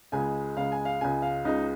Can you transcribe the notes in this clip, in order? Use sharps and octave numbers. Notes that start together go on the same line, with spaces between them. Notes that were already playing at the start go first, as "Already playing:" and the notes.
C#2 C#3 G#3 G#5
C#2 C#3 G#3 F5
G#5
F5
C#2 C#3 G#3 G#5
F5
C#2 C#3 G#3 D#4